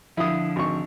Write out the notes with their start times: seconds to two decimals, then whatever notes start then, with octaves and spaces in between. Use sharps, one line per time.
0.17 D3 F3 E4 D#6
0.56 G#1 C#6